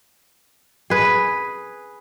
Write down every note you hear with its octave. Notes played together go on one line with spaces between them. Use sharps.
G#4 B4